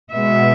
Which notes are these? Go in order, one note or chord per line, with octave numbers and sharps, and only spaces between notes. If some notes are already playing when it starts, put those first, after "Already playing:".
B2 G#3 B3 E5